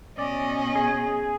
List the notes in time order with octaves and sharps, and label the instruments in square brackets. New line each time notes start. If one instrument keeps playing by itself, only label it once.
[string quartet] B2 C#4 D#5 [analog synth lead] D5
[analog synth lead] G#4